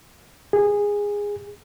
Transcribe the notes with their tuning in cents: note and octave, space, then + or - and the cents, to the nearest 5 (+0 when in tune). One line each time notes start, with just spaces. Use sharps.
G#4 -15